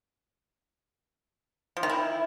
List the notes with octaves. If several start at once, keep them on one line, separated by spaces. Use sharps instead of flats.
F3
D#3
E4